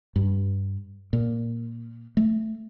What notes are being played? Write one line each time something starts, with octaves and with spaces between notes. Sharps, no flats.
G2
A#2
A3